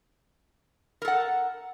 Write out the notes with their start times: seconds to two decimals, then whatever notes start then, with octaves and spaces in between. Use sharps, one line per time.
1.02 A#4
1.05 A4
1.08 F#5